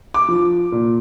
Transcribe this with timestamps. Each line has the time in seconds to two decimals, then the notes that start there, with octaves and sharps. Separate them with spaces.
0.14 D6
0.28 F3
0.72 A#2